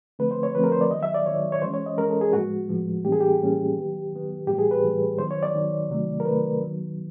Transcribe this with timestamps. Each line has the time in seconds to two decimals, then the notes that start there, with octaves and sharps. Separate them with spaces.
0.19 D3 F3 A3 C4 B4
0.31 C5
0.43 C#5
0.55 D3 F3 A3 C4 B4
0.64 A#4
0.72 C5
0.81 D5
0.91 D#3 F#3 B3 D#5
1.03 E5
1.14 D5
1.26 D#3 F#3 B3 C#5
1.52 C#5
1.62 E3 G#3 C#4 C5
1.74 C#5
1.86 D#5
1.97 E3 G#3 C#4 A#4
2.10 A4
2.21 G#4
2.33 A2 F3 G#3 B3 F#4
2.69 A2 F3 G#3 B3
3.05 A2 E3 G3 A#3 C#4 G4
3.12 G#4
3.20 G4
3.40 A2 E3 G3 A#3 C#4
3.76 D#3 F#3 B3
4.12 D#3 F#3 B3
4.47 A2 E3 G3 B3 G4
4.59 G#4
4.71 B4
4.83 A2 E3 G3 B3
5.19 D#3 F#3 B3 C5
5.31 C#5
5.43 D5
5.54 D#3 F#3 B3
5.89 C3 D#3 F#3 A3
6.20 A#4
6.25 C3 D#3 F#3 A3 B4
6.61 D#3 F#3 B3